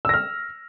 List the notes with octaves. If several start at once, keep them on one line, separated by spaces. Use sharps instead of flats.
E6 F6 A#6